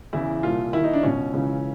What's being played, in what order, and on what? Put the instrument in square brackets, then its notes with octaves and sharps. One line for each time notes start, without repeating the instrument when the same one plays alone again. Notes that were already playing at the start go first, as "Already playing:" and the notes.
[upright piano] E2 C#3 E3 E4
C2 A#2 F4
D#2 D#3 E4
D#4
D4
C#2 B2 C#4
C#2 C#3 E3